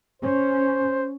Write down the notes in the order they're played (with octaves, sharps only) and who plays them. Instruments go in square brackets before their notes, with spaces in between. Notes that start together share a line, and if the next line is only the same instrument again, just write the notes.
[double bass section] C#4 [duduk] C5